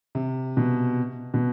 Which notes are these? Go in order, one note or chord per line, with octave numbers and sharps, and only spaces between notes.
C3
B2
B2